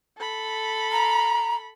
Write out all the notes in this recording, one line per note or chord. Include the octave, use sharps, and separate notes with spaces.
A4 B5
A#5